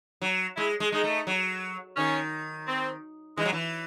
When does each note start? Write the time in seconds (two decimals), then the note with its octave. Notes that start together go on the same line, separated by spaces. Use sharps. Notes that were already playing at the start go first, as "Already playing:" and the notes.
0.22 F#3
0.57 G#3 E4
0.80 G#3
0.92 G#3 D#4
1.04 A3
1.27 F#3
1.97 D#3 C#4
2.67 C4
3.38 E3 G#3
3.45 F#3
3.52 E3